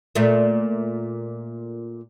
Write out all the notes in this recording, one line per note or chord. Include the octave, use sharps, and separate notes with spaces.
A#2 A3